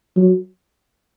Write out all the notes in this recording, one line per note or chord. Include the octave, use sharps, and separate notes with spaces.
F#3